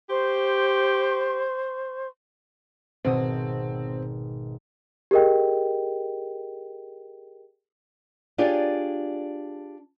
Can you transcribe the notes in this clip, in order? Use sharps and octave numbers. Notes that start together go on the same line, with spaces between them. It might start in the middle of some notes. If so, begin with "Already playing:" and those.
G4 C5 C6 C#6
G#1 B2 C4 D#6
G4 G#4 A#4 D#5 G5
D4 F4 G4 G#4 C#5 D5